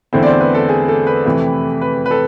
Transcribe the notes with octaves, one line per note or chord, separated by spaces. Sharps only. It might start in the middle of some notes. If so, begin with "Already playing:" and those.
E2 D3 A3 C4 E4 C5
D5
C5
B4
A4
G#4
A4
B4
F2 C3 E3 A3 E4
B4
B4
A4